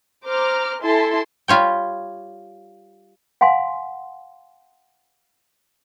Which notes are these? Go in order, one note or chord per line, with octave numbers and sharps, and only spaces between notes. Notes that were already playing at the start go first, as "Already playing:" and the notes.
C5 A#5 D6 F6
E4 A4 G#5 A5 C6
G3 F4 C#5 G5
F5 F#5 G#5 C6